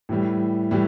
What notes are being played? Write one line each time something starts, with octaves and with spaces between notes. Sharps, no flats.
A2 E3 G3
A2 E3 G3